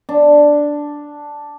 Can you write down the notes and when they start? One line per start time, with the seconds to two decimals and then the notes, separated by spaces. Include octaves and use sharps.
0.09 D4